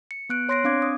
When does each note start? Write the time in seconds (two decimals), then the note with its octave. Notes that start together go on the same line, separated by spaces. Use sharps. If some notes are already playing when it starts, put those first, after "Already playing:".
0.11 C#7
0.30 B3 F#6 D7
0.49 C#5 C6 F#6 A#6 C7 D7
0.64 C4 D4 F5 D6 G#6
0.82 D#6